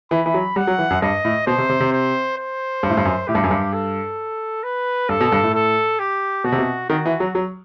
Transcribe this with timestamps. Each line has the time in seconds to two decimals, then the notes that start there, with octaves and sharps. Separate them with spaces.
0.11 E3 B5
0.26 E3
0.34 F#3
0.56 G3 F#5
0.67 F#3
0.79 E3
0.90 F#2
1.02 G2 D#5
1.25 A2
1.47 B2 C5
1.58 C3
1.69 C3
1.80 C3
1.93 C5
2.38 C5
2.83 G2
2.89 A2
2.97 G2
3.05 F#2
3.28 A2 G4
3.35 G2
3.44 F#2
3.51 G2
3.73 A4
4.63 B4
5.09 G2 A4
5.21 B2
5.32 G2
5.43 A2
5.54 A4
5.99 G4
6.44 B2 F#4
6.52 C3
6.59 B2
6.90 D#3 F#4
7.06 E3
7.20 F#3
7.35 F#3